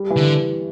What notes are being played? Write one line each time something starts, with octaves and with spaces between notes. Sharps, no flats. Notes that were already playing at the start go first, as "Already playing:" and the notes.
Already playing: G3
E3
D3